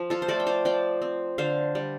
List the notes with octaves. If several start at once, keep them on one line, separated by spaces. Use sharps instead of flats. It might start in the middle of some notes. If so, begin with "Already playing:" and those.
Already playing: F3
F4 A4
C5
A3 A4 D5
G5
C5 F5
F3 D5 G5
C4
D3 C5 F5
G3